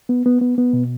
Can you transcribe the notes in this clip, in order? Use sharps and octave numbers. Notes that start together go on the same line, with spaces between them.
B3
B3
B3
B3
B2